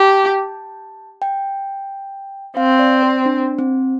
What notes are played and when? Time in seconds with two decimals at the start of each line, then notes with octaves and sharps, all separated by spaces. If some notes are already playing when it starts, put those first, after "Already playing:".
Already playing: G4 A5
1.22 G5
2.57 C4 F5
2.79 D5
3.03 C5
3.26 D4
3.59 C4